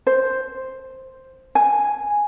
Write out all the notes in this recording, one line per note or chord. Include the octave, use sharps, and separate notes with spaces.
C5
G#5